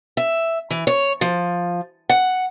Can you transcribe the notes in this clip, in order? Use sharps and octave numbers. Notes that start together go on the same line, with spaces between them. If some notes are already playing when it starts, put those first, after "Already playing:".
E5
E3
C#5
F3
F#5